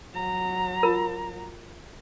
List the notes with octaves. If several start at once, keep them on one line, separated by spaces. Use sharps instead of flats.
F#3 A#5
F4 A#4